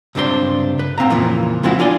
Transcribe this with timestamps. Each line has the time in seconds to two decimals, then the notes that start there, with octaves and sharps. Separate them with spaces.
0.15 C#2 G2 C3 D4 C5 C6
0.79 B4
0.98 G#2 C4 F5 A#5
1.10 F2 A#2 C#3 E3 F3
1.63 F3 G#3 B3 C4 E4 F#4
1.79 D4 F4 D5 G#5 C6